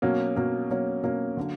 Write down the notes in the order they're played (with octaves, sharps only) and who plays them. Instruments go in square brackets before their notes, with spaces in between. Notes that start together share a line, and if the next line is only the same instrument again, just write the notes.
[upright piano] B2 F#3 A#3 C#4
B2 F#3 A#3 C#4
B2 F#3 A#3 C#4
B2 F#3 A#3 C#4
D3 F#3 A#3